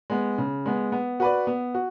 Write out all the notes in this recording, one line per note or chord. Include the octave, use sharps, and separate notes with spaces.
G#3 B3
C#3
G#3 B3
B3
F#4 B4 D5
B3
F#4